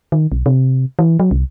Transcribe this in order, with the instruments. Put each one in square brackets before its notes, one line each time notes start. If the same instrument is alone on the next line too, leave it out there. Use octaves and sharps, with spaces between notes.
[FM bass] D#3
B1
C3
E3
F#3
C2